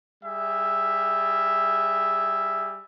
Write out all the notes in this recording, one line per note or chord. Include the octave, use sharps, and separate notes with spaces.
G3 G#4 E5